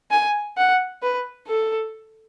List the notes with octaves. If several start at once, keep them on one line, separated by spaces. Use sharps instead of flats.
G#5
F#5
B4
A4